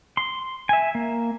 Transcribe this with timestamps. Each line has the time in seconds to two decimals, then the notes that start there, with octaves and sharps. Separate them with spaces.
0.17 C6
0.69 E5 G#5
0.95 A#3